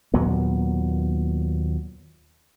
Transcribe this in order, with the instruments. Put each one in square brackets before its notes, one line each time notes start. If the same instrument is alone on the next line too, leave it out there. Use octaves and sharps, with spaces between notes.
[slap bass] D#2 A#2 F#3 B3